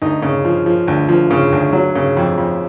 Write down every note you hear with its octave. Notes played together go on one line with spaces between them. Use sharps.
D2 D#4
C#3
F3
F3
D2
F3
C#3
D2
F#3
C#3
F2
F2